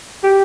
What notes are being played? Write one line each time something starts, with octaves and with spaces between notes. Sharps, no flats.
G4